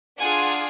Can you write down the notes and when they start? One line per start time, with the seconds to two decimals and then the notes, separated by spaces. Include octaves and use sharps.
0.18 D4 F4 G#4 F#5 G#5